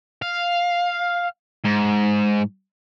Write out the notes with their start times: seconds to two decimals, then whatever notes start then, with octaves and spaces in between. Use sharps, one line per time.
0.22 F5
1.65 G#2